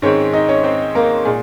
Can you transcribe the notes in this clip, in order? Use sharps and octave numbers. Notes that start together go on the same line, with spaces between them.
G#2 D#3 G#3 C4 C#4 C#5
D#4 D#5
C#4 C#5
C4 C5
A#3 A#4
A#2 G#3 G#4